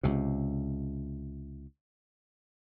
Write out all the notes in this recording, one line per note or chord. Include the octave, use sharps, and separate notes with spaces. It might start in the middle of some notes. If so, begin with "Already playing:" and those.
C#2 C3